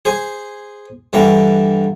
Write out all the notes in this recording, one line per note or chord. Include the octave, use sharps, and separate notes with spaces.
G#4 C5 G#5
G2 D3 E3 A#5